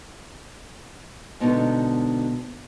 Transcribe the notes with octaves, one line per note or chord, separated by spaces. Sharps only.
G#2 B2 D3 B3 D#4